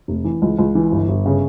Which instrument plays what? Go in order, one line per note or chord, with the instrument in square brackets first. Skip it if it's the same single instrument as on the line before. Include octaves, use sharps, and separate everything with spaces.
[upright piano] F1
E3
C#2
C#2
E3
G1
G1
C#3